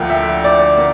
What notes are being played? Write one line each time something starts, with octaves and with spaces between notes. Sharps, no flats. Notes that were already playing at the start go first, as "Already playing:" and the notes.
Already playing: D2 D3 F3 A#3 G5
E5
D5
A#3